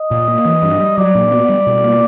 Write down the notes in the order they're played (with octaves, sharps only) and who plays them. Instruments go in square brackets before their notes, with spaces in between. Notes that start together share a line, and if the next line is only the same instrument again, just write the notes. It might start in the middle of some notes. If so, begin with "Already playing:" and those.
Already playing: [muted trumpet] D#5
[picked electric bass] A#2
A#3
E3
G2
G3
[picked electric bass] F#3 [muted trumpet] D5
[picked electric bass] A#2
B3
G3
B2
A#3